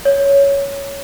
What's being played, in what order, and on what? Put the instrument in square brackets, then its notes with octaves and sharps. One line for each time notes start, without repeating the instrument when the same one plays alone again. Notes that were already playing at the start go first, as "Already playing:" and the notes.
[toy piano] C#5